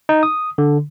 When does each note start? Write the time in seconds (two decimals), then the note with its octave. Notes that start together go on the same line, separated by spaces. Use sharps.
0.09 D#4
0.23 D#6
0.58 D3